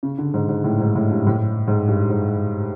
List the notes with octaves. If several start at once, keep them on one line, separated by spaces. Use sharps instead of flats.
C#3
D3
G#2
G#2
A2
G#2
A2
G2
A2
G#2
G2
G#2